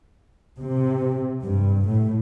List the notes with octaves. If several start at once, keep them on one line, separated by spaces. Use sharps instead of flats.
C3
G2
A2